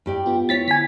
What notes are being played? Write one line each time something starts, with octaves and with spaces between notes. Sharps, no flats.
G2 G4 D5
B3 F4
E4 C#5 A6 B6
D3 G#5 B6